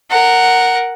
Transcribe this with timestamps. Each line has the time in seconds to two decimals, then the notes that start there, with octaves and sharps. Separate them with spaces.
0.10 A#4 F#5